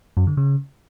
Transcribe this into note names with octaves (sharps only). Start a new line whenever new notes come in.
F#2
D3
C#3